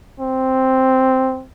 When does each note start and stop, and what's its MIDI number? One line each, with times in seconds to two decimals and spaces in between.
0.20 1.44 60